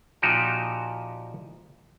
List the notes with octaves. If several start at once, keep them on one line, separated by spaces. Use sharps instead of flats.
A#2 F3 D#4 F#4 G4